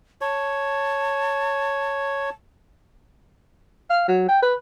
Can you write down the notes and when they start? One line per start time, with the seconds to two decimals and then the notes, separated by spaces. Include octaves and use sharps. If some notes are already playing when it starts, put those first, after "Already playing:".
0.21 C#5 A5
3.90 F5
4.08 F#3
4.28 G5
4.43 B4